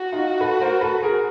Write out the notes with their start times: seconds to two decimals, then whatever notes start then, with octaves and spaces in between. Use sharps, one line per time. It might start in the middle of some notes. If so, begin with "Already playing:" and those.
Already playing: F#4
0.12 D#4 F4
0.40 A4 B4
0.61 A#4 C5
0.81 A4 B4
1.03 G#4 A#4